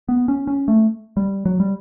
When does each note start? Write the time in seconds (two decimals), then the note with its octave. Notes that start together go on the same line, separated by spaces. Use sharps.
0.09 B3
0.28 C#4
0.47 C#4
0.68 A3
1.17 G3
1.45 F#3
1.60 G3